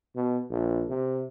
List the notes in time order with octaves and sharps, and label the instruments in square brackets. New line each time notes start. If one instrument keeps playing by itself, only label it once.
[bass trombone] B2
A#1
C3